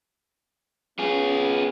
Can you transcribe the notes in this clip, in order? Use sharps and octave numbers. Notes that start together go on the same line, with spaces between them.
B3 C#4 F4 G#4